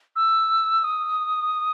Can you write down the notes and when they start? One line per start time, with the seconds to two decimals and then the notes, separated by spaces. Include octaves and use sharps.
0.16 E6
0.84 D#6